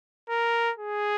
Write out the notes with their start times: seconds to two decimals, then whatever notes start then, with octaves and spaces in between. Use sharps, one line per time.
0.29 A#4
0.77 G#4